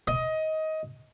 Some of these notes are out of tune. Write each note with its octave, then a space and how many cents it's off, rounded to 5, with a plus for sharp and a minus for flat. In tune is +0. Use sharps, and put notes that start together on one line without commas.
D#5 +20